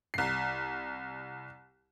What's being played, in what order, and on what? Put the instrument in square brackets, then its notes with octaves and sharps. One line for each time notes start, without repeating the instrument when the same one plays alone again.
[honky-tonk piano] C2 C7